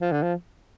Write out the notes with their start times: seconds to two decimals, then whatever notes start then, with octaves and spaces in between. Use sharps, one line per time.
0.01 F3
0.11 D3
0.22 F3